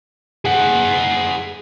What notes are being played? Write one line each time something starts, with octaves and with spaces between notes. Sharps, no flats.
G#4 F#5